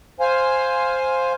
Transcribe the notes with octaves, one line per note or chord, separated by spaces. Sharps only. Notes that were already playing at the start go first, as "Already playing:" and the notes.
C5 F5 G#5